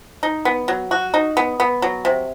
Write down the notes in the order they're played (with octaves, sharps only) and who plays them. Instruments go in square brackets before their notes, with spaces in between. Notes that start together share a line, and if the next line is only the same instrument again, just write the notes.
[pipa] D#4
B3
F#3
F#4
D#4
B3
B3
F#3
C3